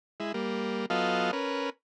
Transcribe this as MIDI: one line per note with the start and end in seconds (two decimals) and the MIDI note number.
0.20 0.32 56
0.20 0.32 64
0.34 0.86 55
0.34 0.86 58
0.90 1.31 54
0.90 1.31 59
0.90 1.31 65
0.90 1.31 69
0.90 1.31 75
0.90 1.31 77
1.33 1.70 61
1.33 1.70 70
1.33 1.70 71